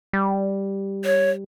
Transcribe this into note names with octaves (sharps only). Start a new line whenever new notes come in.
G3
C#5